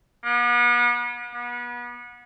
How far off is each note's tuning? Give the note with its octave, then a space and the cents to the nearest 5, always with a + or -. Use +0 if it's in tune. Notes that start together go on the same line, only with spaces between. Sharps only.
B3 -40
B3 -30